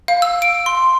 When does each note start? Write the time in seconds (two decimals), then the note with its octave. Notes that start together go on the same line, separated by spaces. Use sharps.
0.08 F5
0.22 E6
0.42 D7
0.66 C6